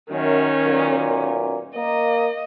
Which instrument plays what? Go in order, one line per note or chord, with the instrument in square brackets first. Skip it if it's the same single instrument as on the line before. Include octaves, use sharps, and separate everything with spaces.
[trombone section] F#2 [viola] D#3 C#4
[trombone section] B1 F#2 A#2
[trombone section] A#3 [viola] D#5